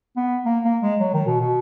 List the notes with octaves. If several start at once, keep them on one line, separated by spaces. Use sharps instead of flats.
B3
A#3
A#3
G#3
F#3
D#3
B2
B2